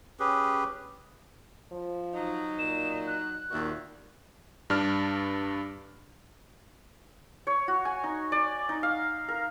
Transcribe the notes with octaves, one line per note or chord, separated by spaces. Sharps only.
C#4 G4 G#4 B4
F3
F#3 D#4
A#2 E7
F#6
D#2 A#2 F#4 E5
G2 D4 F6
C#5
F#4
G#5
D#4
D5
D#4
F5
A#4